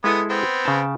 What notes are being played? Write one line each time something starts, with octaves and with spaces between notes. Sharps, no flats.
G#3 B3 E4 A4 D#6
B3 C4
C#3 G5 A5